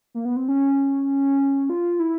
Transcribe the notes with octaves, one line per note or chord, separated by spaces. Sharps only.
A#3
B3
C4
C#4
F4
E4